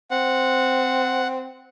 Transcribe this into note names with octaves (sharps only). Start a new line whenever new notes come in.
C4 F#5